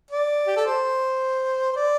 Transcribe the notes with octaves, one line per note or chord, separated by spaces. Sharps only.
D5
G4
A4
C5
C5
D5